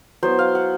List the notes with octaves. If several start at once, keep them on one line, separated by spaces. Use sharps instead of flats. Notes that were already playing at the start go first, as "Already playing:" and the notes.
F#3 B3 E4 C5
F5
F#5